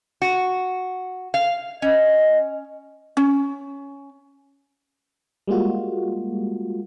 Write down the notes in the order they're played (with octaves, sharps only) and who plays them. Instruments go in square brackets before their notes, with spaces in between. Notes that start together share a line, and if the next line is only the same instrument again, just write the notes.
[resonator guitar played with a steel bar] F#4
F5
[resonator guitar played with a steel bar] C#4 [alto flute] D#5
[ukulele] C#4
[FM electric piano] G3 G#3 A#3 F4 F#4